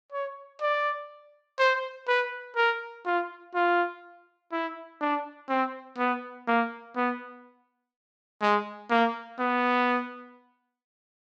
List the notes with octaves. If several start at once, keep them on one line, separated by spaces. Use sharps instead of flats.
C#5
D5
C5
B4
A#4
F4
F4
E4
D4
C4
B3
A#3
B3
G#3
A#3
B3